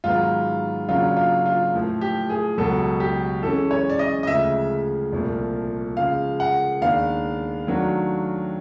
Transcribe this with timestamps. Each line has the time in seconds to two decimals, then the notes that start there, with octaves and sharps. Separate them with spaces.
0.04 G#2 D#3 F#3 B3 F4
0.89 C#3 F#3 A#3 D4 F4
1.17 F4
1.45 F4
1.74 A2 F3 A3
2.01 G4
2.30 G#4
2.58 C#2 B2 F#3 A4
3.00 G4
3.43 E3 G#3 C#4 A4
3.71 C#5
3.90 D5
3.99 D#5
4.23 D#5
4.27 D2 C#3 F3 G#3 E5
5.13 C2 A#2 F3 A3
5.96 C#3 F3 G#3 F5
6.40 F#5
6.81 D#2 D#3 G#3 B3 D4 F5
7.67 D#3 F#3 A3 D4 F#4